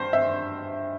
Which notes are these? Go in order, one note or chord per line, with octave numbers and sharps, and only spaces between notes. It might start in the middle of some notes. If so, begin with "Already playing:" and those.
Already playing: G2 C5
E5